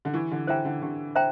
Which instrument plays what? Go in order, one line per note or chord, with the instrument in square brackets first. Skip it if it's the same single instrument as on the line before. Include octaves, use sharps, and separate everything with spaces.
[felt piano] D3
[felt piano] E3 [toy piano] G4
[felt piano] D3
[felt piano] E3 [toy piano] C5 E5 G5 A#5
[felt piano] D3
[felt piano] D3 [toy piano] G4
[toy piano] C5 E5 G5 A#5